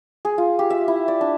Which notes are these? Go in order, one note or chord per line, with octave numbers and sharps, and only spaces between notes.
G#4
F4
G4
E5
E4
D5
D4